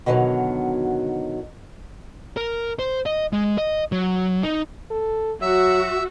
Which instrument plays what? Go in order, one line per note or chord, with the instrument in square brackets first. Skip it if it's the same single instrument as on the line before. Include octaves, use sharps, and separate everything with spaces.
[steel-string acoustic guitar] B2 D3 D#3 F3 F#3
[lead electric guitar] A#4
C5
D#5
G#3
D#5
F#3
D#4
[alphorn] A4
[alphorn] F#3 [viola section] F#4 [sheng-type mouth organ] E5 E6